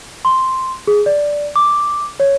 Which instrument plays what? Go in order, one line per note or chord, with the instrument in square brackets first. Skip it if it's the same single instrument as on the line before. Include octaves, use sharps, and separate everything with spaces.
[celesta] C6
G#4
D5
D6
C#5